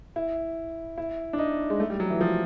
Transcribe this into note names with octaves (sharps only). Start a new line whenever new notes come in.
E4
E4
D4
D#4
G#3
A3
G3
F#3
E3
F3